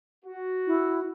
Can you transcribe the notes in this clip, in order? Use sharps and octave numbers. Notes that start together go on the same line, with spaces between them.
F#4
E4